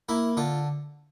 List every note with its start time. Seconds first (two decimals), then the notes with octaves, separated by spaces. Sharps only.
0.09 A#3 E4
0.37 D3 F4